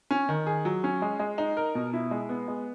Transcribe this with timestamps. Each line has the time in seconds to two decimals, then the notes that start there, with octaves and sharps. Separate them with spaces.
0.11 C#4
0.29 D#3
0.47 G#4
0.65 F#3
0.84 C#4
1.02 G#3
1.20 G#3
1.38 D#4
1.57 A#4
1.75 B2
1.93 E4
2.11 G#3
2.29 B3
2.48 G#3